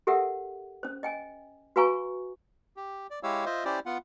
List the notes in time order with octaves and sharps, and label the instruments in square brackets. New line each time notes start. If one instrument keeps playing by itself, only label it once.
[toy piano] G4 A4 A#4 E5 F#5
C#4 C5
D#5 G5 G#5
F#4 B4 F5 G#5 A#5 C#6
[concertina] G4
D5
G#3 E4 G4 C#5 F5 E6
F4 C5 D#5 E5
C#4 E4 G4 C5 D5
B3 F4 F#5